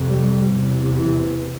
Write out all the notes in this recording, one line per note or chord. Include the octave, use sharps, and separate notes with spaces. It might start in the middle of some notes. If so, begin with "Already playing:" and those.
Already playing: F2 C3
G3
E2 C3
E3